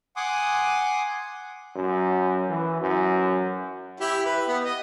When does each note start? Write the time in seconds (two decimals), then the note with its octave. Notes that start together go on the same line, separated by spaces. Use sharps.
0.16 F#5 G#5 C6 D6 D#6
1.75 F#2
2.49 E3
2.81 F#2
4.00 E4 G4 E5
4.26 B4
4.48 B3
4.64 D#5